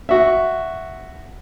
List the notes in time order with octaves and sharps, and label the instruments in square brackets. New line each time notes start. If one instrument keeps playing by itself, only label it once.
[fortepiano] F#4 E5